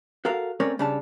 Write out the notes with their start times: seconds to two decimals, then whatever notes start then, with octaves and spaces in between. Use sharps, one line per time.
0.25 F#4 A4 A#4 F5
0.60 A3 C4 C#4 A#4 C#5 D5
0.79 C#3 G3 D4 C#5 A5